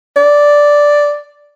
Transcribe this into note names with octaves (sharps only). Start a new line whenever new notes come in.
D5